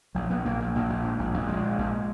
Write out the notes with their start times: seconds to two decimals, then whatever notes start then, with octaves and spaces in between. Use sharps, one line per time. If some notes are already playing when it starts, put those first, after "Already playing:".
0.15 A#1 F#3
0.30 A#1 B3
0.45 A#1 A#3
0.60 A#1
0.75 A#1
0.89 A#1
1.04 G#2
1.19 A#1
1.34 A#1
1.48 A#1 G#3
1.63 G#2
1.78 A#1